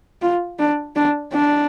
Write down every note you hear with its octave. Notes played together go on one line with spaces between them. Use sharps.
F4
D4
D4
D4